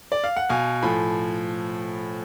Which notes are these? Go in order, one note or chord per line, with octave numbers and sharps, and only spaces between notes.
D5
F5
F#5
B2 F5 G#5
A2 F3 G#5 B5